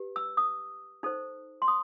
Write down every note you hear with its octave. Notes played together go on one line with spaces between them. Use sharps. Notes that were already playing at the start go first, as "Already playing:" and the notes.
Already playing: G4 B4
E6
D#6
D#4 A4 C5
C6
D#6